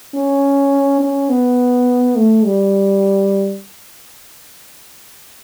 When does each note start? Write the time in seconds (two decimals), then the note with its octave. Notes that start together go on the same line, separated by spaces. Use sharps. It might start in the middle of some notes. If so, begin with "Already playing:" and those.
0.14 C#4
1.01 C#4
1.29 B3
2.16 A3
2.45 G3